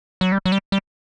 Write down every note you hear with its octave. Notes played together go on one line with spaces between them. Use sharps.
F#3
G3
F#3
G3
G3